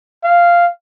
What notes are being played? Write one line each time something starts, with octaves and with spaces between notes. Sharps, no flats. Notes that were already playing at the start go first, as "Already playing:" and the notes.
F5